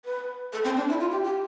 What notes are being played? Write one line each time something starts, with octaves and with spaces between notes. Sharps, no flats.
B4
A4
C4
D4
E4
F4
G4
G4